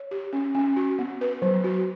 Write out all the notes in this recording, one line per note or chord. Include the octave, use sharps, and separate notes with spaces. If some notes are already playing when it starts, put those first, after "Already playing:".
Already playing: C#5
G4
C#4
C#4
F#4
B3
B4
F#3
F#4